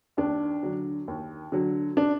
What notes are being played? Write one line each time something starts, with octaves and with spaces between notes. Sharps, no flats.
D#2 D4
D3 F#3
D#2
D3 F#3
D4